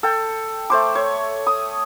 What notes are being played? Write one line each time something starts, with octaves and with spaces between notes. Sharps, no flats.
A4 G5
A3 C5 D6
C#5
D#6